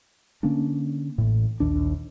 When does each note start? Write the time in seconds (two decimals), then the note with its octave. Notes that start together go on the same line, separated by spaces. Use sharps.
0.43 D3 A#3 C#4 D4
1.18 A1 A2
1.60 A#1 D#2 D4